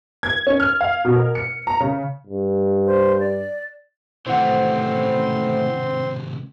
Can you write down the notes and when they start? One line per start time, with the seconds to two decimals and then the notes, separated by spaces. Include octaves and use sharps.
0.23 G#6
0.47 C#4
0.60 F6
0.81 F5
1.05 B2
1.16 A#4
1.35 C#7
1.67 A#5
1.80 C#3
2.27 G2
2.86 C5
3.20 D5
4.27 D#2 C3 E3 A3 C4 C5 F#5 C6